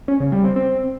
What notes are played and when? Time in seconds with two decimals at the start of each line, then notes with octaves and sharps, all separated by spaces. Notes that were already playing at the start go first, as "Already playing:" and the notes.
0.08 C#4
0.20 C#3
0.32 G3
0.44 C4
0.56 C4